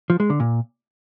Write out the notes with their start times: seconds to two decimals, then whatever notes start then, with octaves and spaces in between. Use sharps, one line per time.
0.10 F3
0.20 G#3
0.30 D3
0.40 A#2